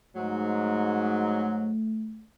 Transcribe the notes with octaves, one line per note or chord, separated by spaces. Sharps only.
G#2 F#3 A3